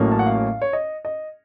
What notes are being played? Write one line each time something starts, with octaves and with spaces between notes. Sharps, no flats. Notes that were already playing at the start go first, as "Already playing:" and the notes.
Already playing: A1 A2 F#3 A#3 C#4
A5
F#5
F5
C#5
D#5
D#5